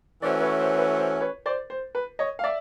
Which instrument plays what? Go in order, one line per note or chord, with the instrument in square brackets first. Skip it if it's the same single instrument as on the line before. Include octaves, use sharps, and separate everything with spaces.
[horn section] E3 A3 C#4 F#4 [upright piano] C5 D5
[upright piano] B4 C#5
C5
C5
B4
C5
B4 C#5
C5 D5
C5
B4
C#5 D#5
F5
D5 E5